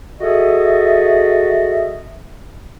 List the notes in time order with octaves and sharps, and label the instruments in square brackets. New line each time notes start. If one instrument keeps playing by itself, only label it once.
[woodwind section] F#4 G#4 A4 D#5 E5